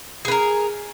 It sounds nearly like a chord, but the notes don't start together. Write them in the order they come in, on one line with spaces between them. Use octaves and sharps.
G#4 B4 A#4